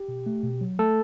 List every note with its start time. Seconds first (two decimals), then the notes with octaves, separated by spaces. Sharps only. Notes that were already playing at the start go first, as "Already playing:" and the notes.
Already playing: G4
0.08 B2
0.26 A3
0.43 B2
0.61 F#3
0.79 A3 A4